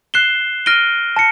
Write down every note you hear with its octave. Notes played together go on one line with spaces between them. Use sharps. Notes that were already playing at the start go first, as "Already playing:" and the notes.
F#6 C7 E7 G7
F6 A#6 D7 D#7 G7
A5 A#6 C#7